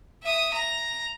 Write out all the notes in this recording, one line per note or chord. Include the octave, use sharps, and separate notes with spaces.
E5 D#6
A#5